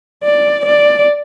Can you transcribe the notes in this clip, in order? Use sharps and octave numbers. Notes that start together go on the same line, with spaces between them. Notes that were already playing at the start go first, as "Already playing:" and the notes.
D5
D5